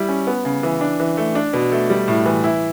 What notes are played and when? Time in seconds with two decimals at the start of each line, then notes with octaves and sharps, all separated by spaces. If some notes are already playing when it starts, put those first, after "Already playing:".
Already playing: G3 E4
0.09 C#4
0.27 B3
0.45 C#3
0.63 E3
0.81 D4
1.00 E3
1.17 A3
1.35 D4
1.53 B2
1.72 A3
1.90 G3
2.08 A2
2.26 E3
2.44 E4